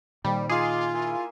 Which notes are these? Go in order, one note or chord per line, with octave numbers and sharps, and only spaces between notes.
F2 A#2 D#3 G3
D#4 F4 G#4 C6 D6
A#3 E4 G#5